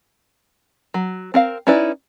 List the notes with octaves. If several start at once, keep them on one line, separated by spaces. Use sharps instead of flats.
F#3
C4 A#4 F5
C#4 D#4 E4 B4 D5